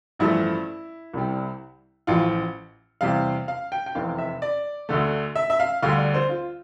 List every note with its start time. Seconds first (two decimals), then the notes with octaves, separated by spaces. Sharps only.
0.19 A1 G2 F3 A3 E4
1.13 C2 C3 G3
2.07 A1 A2 F3 F4
3.01 E2 C3 G3 F5
3.48 F5
3.72 G5
3.86 G5
3.95 F1 E2 C3 F5
4.18 E5
4.42 D5
4.89 D2 D3 A3
5.36 E5
5.50 E5
5.60 F5
5.82 D2 D3 G3 F5
5.98 D5
6.14 C5
6.29 F4